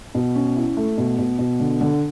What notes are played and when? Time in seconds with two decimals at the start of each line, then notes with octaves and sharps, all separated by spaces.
0.15 B2
0.35 C#4
0.56 E4
0.77 A3
0.98 B2
1.18 B2
1.39 B2
1.60 D3
1.81 D3